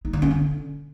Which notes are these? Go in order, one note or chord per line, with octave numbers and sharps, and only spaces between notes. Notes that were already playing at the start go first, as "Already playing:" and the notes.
D#4
D3
C#4
D3